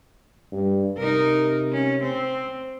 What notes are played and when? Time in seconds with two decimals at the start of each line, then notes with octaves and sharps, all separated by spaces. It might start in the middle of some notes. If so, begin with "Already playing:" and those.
0.52 G2
0.98 C3 D#4 A#4
1.73 C#4
2.02 C4